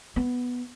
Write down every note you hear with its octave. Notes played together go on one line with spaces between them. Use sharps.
B3